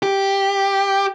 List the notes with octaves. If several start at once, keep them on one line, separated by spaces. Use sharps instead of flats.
G4